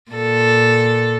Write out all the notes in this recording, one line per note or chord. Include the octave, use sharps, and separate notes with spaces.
A#2 A4